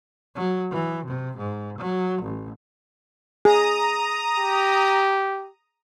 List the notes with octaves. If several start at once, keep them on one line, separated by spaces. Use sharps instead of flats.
F#3
E3
C3
G#2
F#3
A1
G#4 A#5 D#6
G4